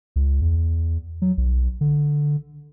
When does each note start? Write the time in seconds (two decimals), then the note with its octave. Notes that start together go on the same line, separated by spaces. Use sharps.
0.16 C#2
0.42 E2
1.22 F#3
1.38 B1
1.81 D3